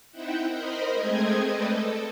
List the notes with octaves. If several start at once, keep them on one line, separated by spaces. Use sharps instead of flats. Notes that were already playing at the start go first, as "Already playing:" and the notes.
C4 D#4 E4 E5 F#5 G5
A#4 C5 D#5 B5
G#3 A3 C4 D#5 G#6
A4 B4 D5 D#5 G5
A4